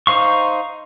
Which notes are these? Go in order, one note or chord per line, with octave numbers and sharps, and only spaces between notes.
D#4 C5 F5 C#6